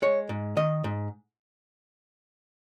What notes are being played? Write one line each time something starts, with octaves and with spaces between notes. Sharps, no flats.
G#3 C#5
G#2
D#3 D#5
G#2